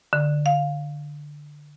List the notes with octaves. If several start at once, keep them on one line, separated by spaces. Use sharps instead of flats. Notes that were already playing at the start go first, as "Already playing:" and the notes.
D3
F5